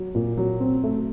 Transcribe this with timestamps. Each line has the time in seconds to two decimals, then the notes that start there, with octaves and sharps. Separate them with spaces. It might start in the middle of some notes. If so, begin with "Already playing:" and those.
Already playing: F#3
0.15 A#2
0.37 F#3
0.60 C4
0.84 A3